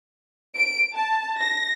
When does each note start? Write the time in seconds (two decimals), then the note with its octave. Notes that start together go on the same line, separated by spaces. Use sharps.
0.57 D7
0.95 A5
1.38 A#6